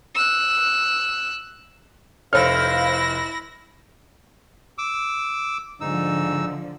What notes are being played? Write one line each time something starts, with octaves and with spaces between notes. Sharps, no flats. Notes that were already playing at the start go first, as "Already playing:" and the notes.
E6 F#6
F1 E4 A4 C5 C#5 F5 F6 A#6
D6 E6
G#2 D3 F3 D#4 E6